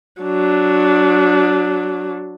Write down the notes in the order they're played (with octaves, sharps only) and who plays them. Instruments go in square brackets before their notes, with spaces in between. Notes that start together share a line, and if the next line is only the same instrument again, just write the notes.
[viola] F#3 D4